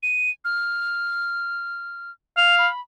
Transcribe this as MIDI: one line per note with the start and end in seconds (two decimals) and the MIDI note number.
0.03 0.30 99
0.45 2.11 89
2.37 2.68 77
2.37 2.56 101
2.59 2.81 83